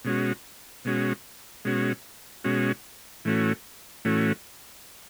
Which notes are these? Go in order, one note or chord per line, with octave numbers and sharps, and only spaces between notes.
B2 G#3 C#4 F#4
B2 G#3 C#4 F#4
B2 G#3 C#4 F#4
B2 G#3 C#4 F#4
A2 E3 A3 C#4 F#4
A2 E3 A3 C#4 F#4